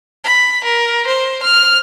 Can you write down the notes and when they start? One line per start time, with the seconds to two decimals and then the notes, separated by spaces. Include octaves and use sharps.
0.24 B5
0.64 A#4
1.06 C5
1.42 F6